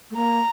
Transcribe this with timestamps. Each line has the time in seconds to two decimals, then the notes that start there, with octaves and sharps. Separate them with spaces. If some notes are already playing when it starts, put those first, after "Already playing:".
0.10 A3
0.16 A#3 A#5